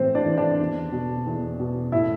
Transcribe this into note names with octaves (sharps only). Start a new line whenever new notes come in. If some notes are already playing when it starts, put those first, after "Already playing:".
Already playing: A2 E3 C4 C5
D4 D5
E3
D4 D5
E2
B2
E2
B2
A2 E4 E5